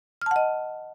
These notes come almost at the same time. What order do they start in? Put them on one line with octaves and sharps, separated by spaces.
F6 A5 F#5 D#5